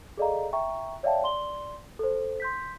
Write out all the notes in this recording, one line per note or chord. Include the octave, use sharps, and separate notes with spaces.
G#4 A4 D5 D#5 F5 A#5
E5 G5 A#5 C#6
C#5 D5 E5 F5 G5 A5
D5 C6 G7
A4 C5
C6 G6 B6